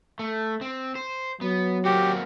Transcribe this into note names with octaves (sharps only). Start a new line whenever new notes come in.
A3
C4
C5
F#3 B3
A#3 C4 F#4 G4